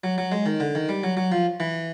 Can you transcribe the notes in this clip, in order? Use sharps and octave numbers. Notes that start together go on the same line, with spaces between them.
F#3
F#3
G#3
D#3
D3
D#3
G3
F#3
F#3
F3
E3